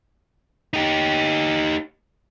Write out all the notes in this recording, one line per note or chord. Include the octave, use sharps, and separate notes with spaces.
D#4 G4